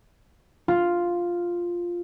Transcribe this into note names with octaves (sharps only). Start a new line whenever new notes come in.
F4